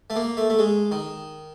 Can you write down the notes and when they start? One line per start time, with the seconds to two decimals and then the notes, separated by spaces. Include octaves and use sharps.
0.10 A3
0.16 A#3
0.37 A3
0.50 A3
0.59 G#3
0.91 D#3